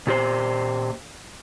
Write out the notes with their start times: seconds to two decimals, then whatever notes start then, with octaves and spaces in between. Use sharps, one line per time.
0.07 A#2 G4 C5